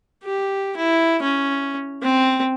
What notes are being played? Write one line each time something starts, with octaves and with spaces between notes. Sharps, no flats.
G4
E4
C#4
C4